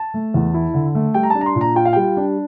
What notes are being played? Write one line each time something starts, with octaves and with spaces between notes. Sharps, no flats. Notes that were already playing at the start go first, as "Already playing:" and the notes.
Already playing: A5
A3
E2
E4
D3
A3
G3 G5
A#5
D4 A5
A#5
C6
A#2
A#5
F4 G5
F5
G3 G5
D4